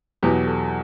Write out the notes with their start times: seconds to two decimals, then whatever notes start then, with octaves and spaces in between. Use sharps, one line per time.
0.23 E2 B2 F#3 G4
0.47 A4